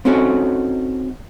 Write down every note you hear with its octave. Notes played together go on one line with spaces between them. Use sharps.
C4 C#4 D#4 F#4 A4 C#5